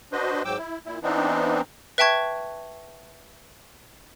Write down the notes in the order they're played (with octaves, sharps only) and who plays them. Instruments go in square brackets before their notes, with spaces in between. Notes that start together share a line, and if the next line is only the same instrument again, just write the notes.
[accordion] D4 F#4 B4 C5 D#5
G#2 F#3 G5 D6 E6
E4
A#2 E4
E3 B3 C4 D4 D#4
[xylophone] B4 E5 G5 A5 C#6 G#6